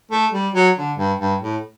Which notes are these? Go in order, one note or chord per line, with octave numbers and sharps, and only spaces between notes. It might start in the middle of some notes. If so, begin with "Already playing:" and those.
A3
G3
F#3
D3
G2
G2
A2